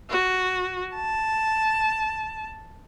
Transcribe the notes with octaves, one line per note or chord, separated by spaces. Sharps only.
F#4
A5